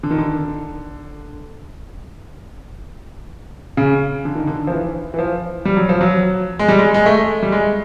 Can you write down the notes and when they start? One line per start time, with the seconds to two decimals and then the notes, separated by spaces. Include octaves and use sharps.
0.03 D3
0.11 D#3
0.18 D3
3.77 C#3
4.25 D3
4.35 D#3
4.47 D3
4.67 F3
4.71 E3
5.14 E3
5.19 F3
5.65 G3
5.77 F#3
5.89 F3
6.01 F#3
6.59 G#3
6.68 G3
6.79 G#3
6.94 G#3
7.06 A3
7.43 G3
7.52 G#3